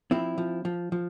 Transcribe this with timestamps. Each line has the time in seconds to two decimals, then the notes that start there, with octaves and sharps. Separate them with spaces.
0.11 F3 C4 E4
0.38 F3
0.65 F3
0.92 F3